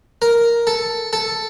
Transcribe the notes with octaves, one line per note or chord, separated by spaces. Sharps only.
A#4
A4
A4